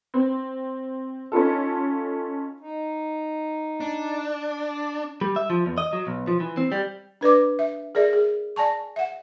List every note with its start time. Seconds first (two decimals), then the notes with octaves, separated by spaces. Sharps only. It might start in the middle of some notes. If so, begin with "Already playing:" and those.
0.14 C4
1.32 C#4 D#4 F4 A4
2.58 D#4
3.80 D4
5.21 G3
5.36 E5
5.50 F3
5.66 E2
5.78 D#5
5.93 F#3
6.07 B1
6.27 F3
6.40 E3
6.57 C4
6.72 G3
7.21 D4 B4 D5 D6
7.59 E5
7.95 G#4 A#4 D5 E5
8.13 G#4
8.56 D5 G#5 A5 C#6
8.96 E5 F#5